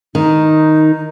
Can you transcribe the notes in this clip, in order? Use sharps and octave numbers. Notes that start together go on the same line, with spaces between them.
D#3 D#4